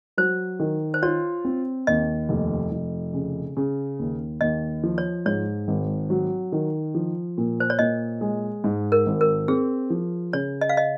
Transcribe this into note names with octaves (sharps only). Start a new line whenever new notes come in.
F#3 C5
D#3
C5
F4 C#5
C4
D#2 D#5
F1
F1
C#3
C#3
D#2
D#2 D#5
F3
C#5
G#2 C#5
G#1
F#3
D#3
F3
A#2
C5
C#5
A#2 D#5
G#3
G#2
A#4
G#1
A#4
C4 G#4
F3
C#3 C#5
D#5
F5
D#5